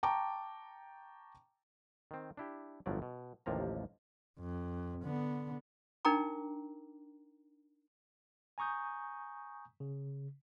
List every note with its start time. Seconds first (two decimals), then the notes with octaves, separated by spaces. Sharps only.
0.03 G5 A5 A#5 C#6 D6
2.11 D#3 C4
2.37 D4 E4 G4
2.86 G1 A2 F3 F#3 D5
3.02 B2
3.46 A1 D#2 C3 F3 A#3 A#5
4.39 F2
5.03 D3 B3
6.05 D4 D#4 A#4 G5 A#5 D6
8.58 G#5 A#5 C#6 D#6 G6
9.80 C#3